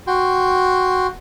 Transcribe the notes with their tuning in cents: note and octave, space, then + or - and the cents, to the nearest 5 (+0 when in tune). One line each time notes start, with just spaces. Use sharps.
F#4 +0 G5 +0 C6 +0